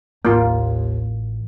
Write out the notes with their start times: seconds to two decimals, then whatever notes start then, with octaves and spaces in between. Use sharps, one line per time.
0.25 A1 D#2 A#3 F4